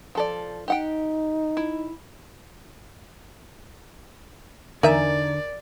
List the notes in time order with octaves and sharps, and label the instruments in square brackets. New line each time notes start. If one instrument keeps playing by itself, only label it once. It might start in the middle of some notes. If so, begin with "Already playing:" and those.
[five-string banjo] F3 A4 D5
[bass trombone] D#4 [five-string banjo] G4 F#5 G5
[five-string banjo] E4
[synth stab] E2 A#4 G#5 [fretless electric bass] D3 [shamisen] D#4 E5 [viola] D5